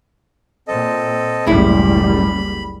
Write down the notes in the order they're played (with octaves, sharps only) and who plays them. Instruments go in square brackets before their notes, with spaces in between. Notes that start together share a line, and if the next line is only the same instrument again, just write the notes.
[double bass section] A#2 [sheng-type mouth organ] C4 A4 D#5
[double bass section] F#1 C#2 G3 [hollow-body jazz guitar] A2 E4 [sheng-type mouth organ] B5